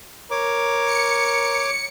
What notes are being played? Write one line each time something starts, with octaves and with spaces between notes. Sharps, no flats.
A#4 C#5 D6
C#7